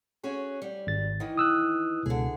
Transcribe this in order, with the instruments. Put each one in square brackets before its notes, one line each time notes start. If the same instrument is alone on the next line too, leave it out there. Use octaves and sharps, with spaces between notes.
[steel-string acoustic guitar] C#4 F#4 G#4
G3
[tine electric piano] G#1 A6
[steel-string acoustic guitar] D#3 E3
[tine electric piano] D#6 E6 F#6
[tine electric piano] C#2 B2 [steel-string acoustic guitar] D3 G#4